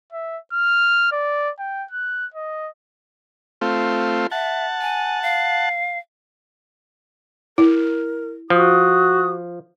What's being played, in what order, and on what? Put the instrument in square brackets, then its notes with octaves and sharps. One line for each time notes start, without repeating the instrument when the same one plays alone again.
[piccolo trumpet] E5
F6
D5
G5
F#6
D#5
[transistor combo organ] A3 C4 F4
[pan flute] E5 [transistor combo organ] F#5 A5
[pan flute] G#5
F5
[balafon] E4 [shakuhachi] A#4
[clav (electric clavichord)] F3 [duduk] F#4 [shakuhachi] D#6